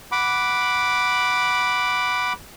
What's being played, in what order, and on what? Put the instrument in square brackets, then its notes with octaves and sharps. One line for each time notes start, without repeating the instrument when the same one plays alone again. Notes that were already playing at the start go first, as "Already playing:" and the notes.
[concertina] F#5 B5 D6